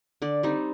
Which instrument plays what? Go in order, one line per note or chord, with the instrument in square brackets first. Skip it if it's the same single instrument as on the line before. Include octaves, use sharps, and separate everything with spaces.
[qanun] D3 D5
G3 C4 D#4